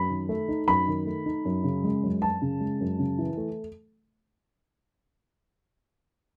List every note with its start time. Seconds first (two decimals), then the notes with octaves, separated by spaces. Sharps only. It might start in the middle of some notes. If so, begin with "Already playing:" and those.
Already playing: F#2 B5
0.10 D#3
0.29 A3
0.49 D#4
0.68 F#2 B5
0.88 D#3
1.06 A3
1.26 D#4
1.45 F#2
1.64 C#3
1.84 G#3
2.03 F#2
2.22 F#2 A5
2.42 C#3
2.61 G#3
2.80 F#2
2.99 C#3
3.18 E3
3.37 A3